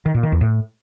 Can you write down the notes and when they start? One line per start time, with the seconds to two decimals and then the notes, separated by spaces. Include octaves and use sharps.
0.06 D#3
0.14 A#2
0.23 D#3
0.32 E2
0.41 A2